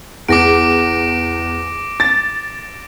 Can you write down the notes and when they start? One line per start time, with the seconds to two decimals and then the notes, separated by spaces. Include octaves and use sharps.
0.28 E2 D6 A#6 D7
2.00 A6